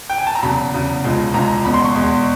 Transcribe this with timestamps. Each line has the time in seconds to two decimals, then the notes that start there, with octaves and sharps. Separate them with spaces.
0.10 G5
0.18 G#5
0.27 A5
0.35 A#5
0.43 E2 C#3 F#3 B5
0.73 E2 C#3 F#3
1.04 C#2 C#3 F3 G#3
1.34 C#2 C#3 F3 G#3 A#5
1.65 E2 B2 G#3 B5
1.74 C6
1.84 C#6
1.95 E2 B2 G#3